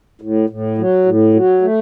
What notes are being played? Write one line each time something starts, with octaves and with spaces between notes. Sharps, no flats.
A2
A2
F#3
A2
F#3
A3